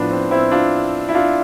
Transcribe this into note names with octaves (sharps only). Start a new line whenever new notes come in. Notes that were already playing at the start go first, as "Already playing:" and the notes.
Already playing: A2 F3 B3 D4
C4
C4 E4
D4 F4
E4
D4 F4